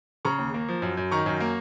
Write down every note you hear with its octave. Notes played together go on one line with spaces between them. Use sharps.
C#3 A#5 C#6
D#2
A#3
F3
F#2
F#2
D#3 A#5 C#6
F#2
A#3